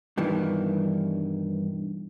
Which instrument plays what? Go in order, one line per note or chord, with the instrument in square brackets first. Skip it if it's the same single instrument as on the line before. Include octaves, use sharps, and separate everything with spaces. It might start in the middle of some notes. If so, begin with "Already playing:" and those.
[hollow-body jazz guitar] G2 B2 D#3 E3